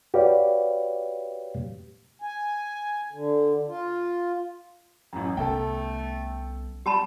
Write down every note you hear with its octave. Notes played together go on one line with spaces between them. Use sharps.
F#4 G4 B4 C#5 D5 F5
G#5
D3
F4
A1 F#2
C2 A3 B3 C#4 A4 G5
G3 G4 A5 B5